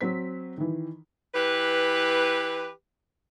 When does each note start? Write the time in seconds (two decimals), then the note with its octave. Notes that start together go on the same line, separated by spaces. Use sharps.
0.01 F#3 C4 B6
0.57 D#3 E3
1.33 E3 G4 B4